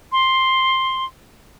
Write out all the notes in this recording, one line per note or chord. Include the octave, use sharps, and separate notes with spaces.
C6